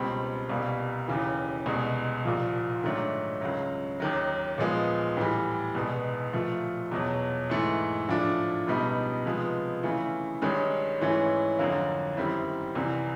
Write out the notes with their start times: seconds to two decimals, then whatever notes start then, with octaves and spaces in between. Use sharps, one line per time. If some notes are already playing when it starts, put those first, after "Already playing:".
Already playing: C#2 B2 G3 C4
0.49 C2 B2 G3 A#3
1.08 D#2 C#3 E3
1.66 C2 B2 G#3
2.25 C2 A#2 F3
2.83 G#2 D#3 F#3 A3 D4
3.41 C#2 C#3 F#3
4.00 D#2 D#3 F#3
4.58 A#2 F3 G#3 B3
5.17 A2 E3 G3
5.75 C2 B2 G#3 B3
6.33 A#2 F3 A3
6.91 E2 B2 F#3
7.50 G#2 E3 A3
8.08 A2 F3 A3 D4
8.67 C#2 B2 G3 B3 D#4
9.25 C3 F3 G#3 B3
9.83 C#3 E3 A3
10.42 G2 D#3 G#3 C#4
11.00 G#2 E3 A3 C#4
11.59 F2 D3 F#3 A#3
12.17 F#2 D#3 G3 C4 E4
12.75 C2 C3 E3